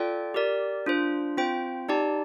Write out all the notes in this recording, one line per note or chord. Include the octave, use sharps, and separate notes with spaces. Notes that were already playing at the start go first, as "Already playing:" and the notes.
Already playing: F4 A4 D5 G5
G4 A#4 D5
D4 F4 C5
C4 F4 C5 G5
D#4 G4 D5 A5